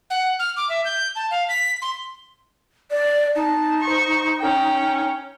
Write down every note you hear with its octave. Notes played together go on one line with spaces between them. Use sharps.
F#5
F6
D6
E5
G6
A5
F5
B6
C6
D5
D#4 A5
C5 C#6
C#4 G5